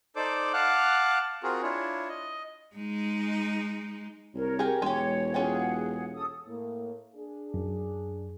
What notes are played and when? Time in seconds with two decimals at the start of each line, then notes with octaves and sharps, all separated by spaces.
0.16 D#4 A4 C5 D5 D6
0.54 F5 F#5 A5 D6 F6 F#6
1.43 C4 F4 F#4 G#4 A#4
1.63 D4 E4 F4 C#5
2.09 D#5
2.76 G#3 D#4
4.34 C2 A#4 C#5
4.59 G4 G#4
4.82 E1 G#3 G4 C#5
5.34 C#4 F4 G4 G#4 F#5
6.15 A4 D#6
6.47 A2 A#3
7.15 D4 G#4
7.54 F#2